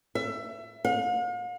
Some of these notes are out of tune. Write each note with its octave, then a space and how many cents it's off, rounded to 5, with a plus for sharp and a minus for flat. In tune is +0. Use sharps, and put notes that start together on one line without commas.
E5 +25
F5 +45